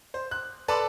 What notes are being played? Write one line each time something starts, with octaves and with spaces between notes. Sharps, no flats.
C5
F#6
A4 B4 D5 A5 B5 C6